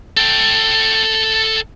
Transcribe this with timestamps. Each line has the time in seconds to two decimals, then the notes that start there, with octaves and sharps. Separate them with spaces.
0.17 A4 G5